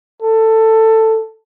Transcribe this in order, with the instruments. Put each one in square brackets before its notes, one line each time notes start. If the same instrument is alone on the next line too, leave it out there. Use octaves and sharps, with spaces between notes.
[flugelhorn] A4